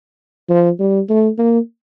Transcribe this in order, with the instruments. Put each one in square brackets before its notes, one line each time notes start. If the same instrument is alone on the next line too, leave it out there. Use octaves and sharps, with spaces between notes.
[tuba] F3
G3
A3
A#3